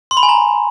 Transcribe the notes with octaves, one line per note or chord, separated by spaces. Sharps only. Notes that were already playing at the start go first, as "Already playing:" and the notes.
C6
B5
G#5
A#5